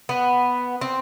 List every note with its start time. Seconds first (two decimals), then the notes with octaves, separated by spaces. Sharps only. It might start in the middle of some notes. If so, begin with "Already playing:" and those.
0.09 B3
0.81 C4